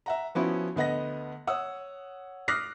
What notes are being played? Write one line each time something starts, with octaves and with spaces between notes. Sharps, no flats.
E5 F#5 A#5
F3 B3 C#4 E4 F#4
D2 B3 D#5 F#5 A#6
C#5 F#5 D#6 E6
D6 D#6 F6 F#6 A#6 C7